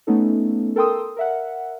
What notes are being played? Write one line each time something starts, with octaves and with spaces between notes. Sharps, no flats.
A3 B3 C#4 D#4 A4
A4 A#4 G5 C6 D#6 E6
A#4 E5 F#5